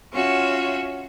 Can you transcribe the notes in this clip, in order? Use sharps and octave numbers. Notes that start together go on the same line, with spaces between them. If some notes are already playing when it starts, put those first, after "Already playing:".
C#4 F4 F#4 E5